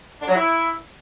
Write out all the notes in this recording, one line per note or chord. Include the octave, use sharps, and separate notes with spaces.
D4
F#3
E4